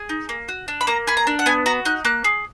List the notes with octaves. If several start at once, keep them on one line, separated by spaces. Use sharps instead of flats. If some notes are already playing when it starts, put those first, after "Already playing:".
Already playing: G#4
D#4
A#3
F#4
D4
B5
A#3 A#5
G#4 B5
A#5
D4
F#5
B3 G#5
F#4 A#5
D#4 F#6
A#3 F#6
G#4